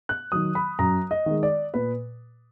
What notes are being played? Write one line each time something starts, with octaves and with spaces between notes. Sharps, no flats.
F#6
D#3 F#3 D#6
B5
F#2 A#5
D#5
D#3 G#3
D5
A#2 B4